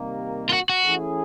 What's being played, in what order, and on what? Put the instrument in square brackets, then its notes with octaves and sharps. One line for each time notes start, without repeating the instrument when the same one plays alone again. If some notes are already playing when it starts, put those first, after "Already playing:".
Already playing: [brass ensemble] C3 D#3 G3 A#3
[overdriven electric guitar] F4
F#4
F#4
[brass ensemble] E3 A3 C#4 E4 G#4